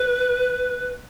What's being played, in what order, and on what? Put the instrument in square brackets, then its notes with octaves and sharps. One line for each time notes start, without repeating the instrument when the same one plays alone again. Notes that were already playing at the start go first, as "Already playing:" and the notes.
Already playing: [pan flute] B4